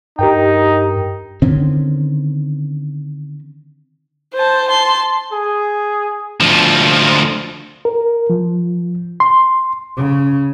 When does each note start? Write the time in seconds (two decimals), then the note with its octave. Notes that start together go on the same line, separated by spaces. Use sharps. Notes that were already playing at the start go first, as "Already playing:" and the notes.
0.19 G2 D#4 G4 A#4 G5
1.42 D3 D#3 C4 C#4
4.34 C5 A5
4.68 A5 C6
5.32 G#4
6.40 D2 F3
7.85 A#4
8.30 F3
9.20 C6
9.97 C#3